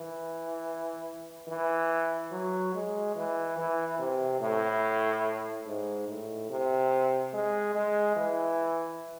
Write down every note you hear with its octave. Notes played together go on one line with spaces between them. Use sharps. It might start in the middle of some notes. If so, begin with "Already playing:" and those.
Already playing: E3
E3
F#3
G#3
E3
E3
C3
A2
G#2
A2
C3
G#3
G#3
E3